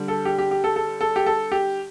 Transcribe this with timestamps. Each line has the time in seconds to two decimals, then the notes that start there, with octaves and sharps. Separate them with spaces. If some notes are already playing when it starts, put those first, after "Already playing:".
Already playing: D3 G3
0.08 A4
0.25 G4
0.38 G4
0.51 G4
0.64 A4
0.76 A4
1.01 A4
1.16 G4
1.26 A4
1.52 G4